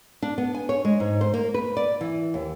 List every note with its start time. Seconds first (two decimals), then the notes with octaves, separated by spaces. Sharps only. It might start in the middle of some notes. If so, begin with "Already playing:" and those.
0.22 D4
0.38 B3
0.55 G#5
0.69 C#5
0.85 G#3
1.00 G#2
1.21 C5
1.34 A#3
1.54 B4
1.77 D5
2.01 E3
2.34 D#2